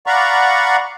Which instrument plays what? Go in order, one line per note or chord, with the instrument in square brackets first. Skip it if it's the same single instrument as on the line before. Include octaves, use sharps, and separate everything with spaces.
[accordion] D5 F5 F#5 A#5 B5 C#6